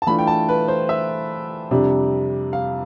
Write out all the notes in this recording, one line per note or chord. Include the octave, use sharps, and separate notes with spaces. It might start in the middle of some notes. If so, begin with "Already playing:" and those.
A5
E3 A3 D4 F4 B5
G5
A5
B4
C5
E5
F2 C3 G3 D4
F5